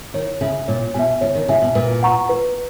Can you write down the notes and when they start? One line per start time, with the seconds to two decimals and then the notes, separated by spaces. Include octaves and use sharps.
0.14 D#3 C#5
0.41 C#3 E5 G#5
0.68 A#2 C#5
0.94 B2 G#5
0.99 E5
1.21 C#3 C#5
1.35 D#3
1.48 C#3 E5 G#5
1.62 B2
1.75 A#2 B4
2.03 F#5 A#5 C#6
2.29 B4